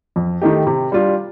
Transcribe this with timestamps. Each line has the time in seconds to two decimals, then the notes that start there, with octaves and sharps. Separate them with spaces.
0.16 F2
0.42 D#3 A3 D#4 G4
0.67 C3
0.92 G3 D4 F4